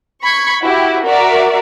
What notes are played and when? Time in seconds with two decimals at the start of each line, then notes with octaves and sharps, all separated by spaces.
0.23 B5 C#6 G#6 C#7
0.63 E4 F#4 G4
1.05 F#4 A#4 D5 E5